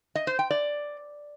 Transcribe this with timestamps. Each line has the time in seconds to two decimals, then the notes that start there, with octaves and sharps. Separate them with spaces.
0.15 D#5
0.27 C5
0.39 G5
0.50 D5